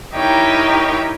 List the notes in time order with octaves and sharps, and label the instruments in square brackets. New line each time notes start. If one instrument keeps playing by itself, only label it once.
[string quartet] D#4 E4 G4 A#4 C#5 G5